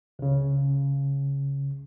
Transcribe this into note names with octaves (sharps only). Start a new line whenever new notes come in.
C#2 C#3